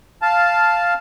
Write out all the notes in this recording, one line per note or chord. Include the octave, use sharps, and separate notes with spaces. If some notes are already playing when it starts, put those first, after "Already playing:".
F5 A5